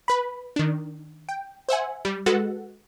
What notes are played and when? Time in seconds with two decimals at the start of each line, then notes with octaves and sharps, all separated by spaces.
0.08 B4 B5
0.56 D#3 D4
1.29 G5
1.69 C5 E5 F#5 G#5
2.05 G3
2.26 G#3 F#4 A4 B4 F#5